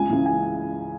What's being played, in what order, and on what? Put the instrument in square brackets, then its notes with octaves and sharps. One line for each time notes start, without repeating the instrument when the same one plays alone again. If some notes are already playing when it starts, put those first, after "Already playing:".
Already playing: [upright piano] C#2 G#5
C#3 E3
G#5